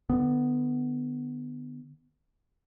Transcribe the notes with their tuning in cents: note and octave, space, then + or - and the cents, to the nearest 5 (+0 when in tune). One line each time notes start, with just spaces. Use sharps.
D3 +30 B3 +10